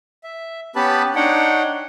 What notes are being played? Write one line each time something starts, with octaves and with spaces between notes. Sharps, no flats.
E5
B3 C#4 G4 B4 A5 B5
D4 D#4 C#5 F#5 G5